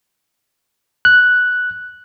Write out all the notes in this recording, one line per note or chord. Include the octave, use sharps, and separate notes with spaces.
F#6